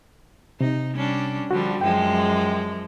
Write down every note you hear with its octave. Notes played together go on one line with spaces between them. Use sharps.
C3 D#4
G3 C#4 D4
D3 F3 G3 F#4
F#2 F3 G#3 G5